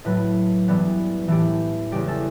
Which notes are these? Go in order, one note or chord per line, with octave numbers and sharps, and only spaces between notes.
A2 F#3 A3 B4
G2 E3 G3 B3
A2 E3 A3 G4
E2 C#3 G3 G4
A4